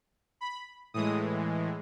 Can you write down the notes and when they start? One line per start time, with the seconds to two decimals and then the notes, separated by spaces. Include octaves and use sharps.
0.41 B5
0.94 A2 E3 G#3 D#6